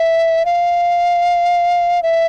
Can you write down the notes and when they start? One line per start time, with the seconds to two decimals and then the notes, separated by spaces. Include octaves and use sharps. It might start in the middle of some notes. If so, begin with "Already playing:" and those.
Already playing: E5
0.45 F5
2.03 E5